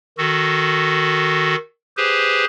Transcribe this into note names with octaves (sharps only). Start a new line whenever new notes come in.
D#3 F#4 A4
G4 G#4 B4 C5